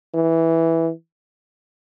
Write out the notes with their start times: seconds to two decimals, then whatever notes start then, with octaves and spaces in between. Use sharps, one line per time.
0.15 E3